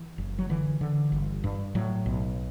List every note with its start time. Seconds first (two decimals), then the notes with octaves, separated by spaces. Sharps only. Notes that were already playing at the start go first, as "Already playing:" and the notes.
Already playing: E3
0.18 F#1
0.39 F#3
0.49 D3 E3
0.81 D3
1.12 G1
1.44 G2
1.75 A2 F#3
2.06 B1